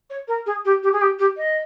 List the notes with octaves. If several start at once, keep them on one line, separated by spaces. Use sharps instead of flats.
C#5
A#4
G#4
G4
G4
G#4
G4
G4
D#5